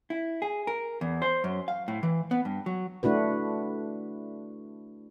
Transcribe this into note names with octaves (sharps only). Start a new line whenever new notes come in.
E4
G#4
A#4
E2
C5
F#2
F5
A2
E3
B3
G2
F#3
A3 D4 E4 F#4 B4